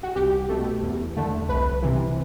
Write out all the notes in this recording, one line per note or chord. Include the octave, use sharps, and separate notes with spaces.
F#4
C2 G4
B2 A3
E2
D3 A3
C2 B4
C3 E3